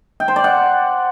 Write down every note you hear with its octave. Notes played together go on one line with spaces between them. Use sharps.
G5
C5
D5
F#5